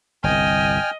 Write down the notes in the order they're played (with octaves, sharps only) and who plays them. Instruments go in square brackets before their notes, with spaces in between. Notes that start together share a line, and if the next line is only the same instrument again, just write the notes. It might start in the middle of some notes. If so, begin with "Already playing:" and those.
[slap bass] G1 C2 [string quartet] D#5 [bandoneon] G5 G#5 F6